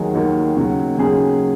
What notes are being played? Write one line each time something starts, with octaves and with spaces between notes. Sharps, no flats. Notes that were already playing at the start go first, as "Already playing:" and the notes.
Already playing: D#2 D#3 F#3 G#4
D#2 D#3 F#3
D#2 C#3 F#3
D#2 C#3 F#3 G#4